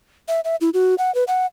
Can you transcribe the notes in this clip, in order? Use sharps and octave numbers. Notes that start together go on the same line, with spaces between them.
E5
E5
E4
F#4
F#5
B4
F#5